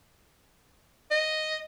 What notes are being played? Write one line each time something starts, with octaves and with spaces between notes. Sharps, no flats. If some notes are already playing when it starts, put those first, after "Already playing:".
D#5